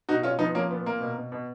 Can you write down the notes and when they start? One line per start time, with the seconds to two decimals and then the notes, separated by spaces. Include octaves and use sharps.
0.09 B2 D#4 F#4
0.23 B2 C#4 F4
0.39 F3 B3 D#4
0.55 F3 A#3 C#4
0.70 A#2 B3
0.86 A#2 A#3
1.01 B2
1.16 B2
1.32 B2